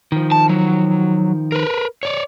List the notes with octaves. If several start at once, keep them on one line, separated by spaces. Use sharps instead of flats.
D#3 F3
A5
F#3
A#4 B4
C#5 D5